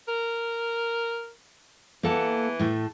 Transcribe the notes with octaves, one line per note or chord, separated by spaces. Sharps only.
A#4
E3 A#3 A4 F#5
A2 A3